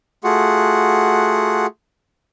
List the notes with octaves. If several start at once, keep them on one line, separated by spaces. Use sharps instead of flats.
A3 F4 F#4 G#4 F#5